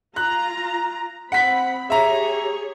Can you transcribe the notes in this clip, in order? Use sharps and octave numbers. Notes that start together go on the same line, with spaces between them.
F4 A#5 F#6
C4 F#5 B5 B6
G4 G#4 C#5 E5 A#5